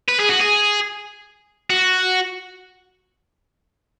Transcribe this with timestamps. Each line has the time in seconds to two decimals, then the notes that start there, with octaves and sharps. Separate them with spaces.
0.09 B4
0.20 G#4
0.30 F#4
0.40 G#4
1.70 F#4